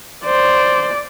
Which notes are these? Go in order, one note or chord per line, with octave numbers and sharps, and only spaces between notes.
C5 D5